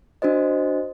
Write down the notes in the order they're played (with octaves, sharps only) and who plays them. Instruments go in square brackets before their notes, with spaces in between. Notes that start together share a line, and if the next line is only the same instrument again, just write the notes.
[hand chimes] D4 F#4 C5 D#5